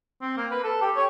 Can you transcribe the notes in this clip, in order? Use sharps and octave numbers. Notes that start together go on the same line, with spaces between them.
C4
A#3
B4
A4
G4
C#5